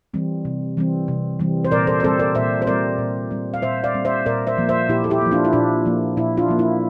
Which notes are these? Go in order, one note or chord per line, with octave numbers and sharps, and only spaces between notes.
E3 G3 C4
C3
E3 G3 C4
C3
E3 G3 C4
C5
A#2 A#4 D5
A4 C5
D5
G3 C4 A4 C5
A#4 D5
A#2 C5 E5
C5
G3 C4 A#4 D5
A#2
G3 C4
F5
A#2 C5 E5
D5 F5
G3 C4
C5 E5
A#2 A#4 D5
C5 E5
F3 A#3
C5 E5
A#2 E4 G4
A4
E4 G4
F3 A#3
D4 F4
E4
A#2 D4
F3 A#3
A#2 E4
D4 F4
F3 A#3
E4